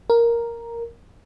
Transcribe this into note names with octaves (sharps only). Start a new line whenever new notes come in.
A#4